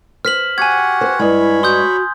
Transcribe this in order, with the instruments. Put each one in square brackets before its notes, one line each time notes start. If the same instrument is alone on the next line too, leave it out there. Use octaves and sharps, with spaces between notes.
[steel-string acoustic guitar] C5 [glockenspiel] F6 B6 F#7
[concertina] F#4 G4 F#5 [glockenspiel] G#5 G#6
[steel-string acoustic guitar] C5
[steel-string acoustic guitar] G2 G#3 [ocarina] E4 [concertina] C#5 B5
[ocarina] F#4 [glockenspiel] C6 D#6 G6